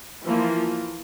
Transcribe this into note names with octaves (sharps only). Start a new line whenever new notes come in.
E3 F3 A#3 F4